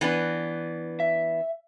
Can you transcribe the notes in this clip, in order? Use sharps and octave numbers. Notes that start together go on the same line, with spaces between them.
E3 B3 D4
E5